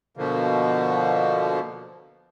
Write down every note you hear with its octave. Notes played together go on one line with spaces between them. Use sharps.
B2 D3 F3 A#3